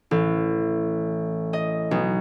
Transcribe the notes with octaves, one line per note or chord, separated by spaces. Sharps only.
A1
D#5
B1